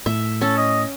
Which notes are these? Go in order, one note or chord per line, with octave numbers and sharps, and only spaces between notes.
A2 E5
C#4 A4
D#5